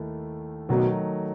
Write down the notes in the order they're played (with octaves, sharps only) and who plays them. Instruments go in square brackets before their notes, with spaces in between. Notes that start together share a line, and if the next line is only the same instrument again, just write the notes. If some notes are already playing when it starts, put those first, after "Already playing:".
Already playing: [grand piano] D#2 D#3 A3 E4
[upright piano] B2 [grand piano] D#3 F#3 A3 D#4